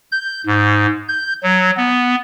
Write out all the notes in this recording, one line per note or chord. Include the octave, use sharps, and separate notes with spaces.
G6
G#2
G6
F#3
B3